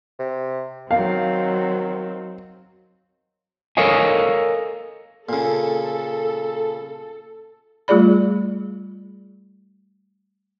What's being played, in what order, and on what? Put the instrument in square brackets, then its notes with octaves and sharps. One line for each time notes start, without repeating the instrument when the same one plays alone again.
[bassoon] C3
[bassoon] D#3 [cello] F#3 C4 [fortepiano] F5
[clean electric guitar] A4 A#4 C#5 D#5 F5 G#5
[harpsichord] A#2 C#3 [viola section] A4
[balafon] G3 A3 F4 G#4 D5 B5